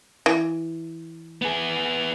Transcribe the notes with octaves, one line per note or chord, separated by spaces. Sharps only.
E3
B3 G#4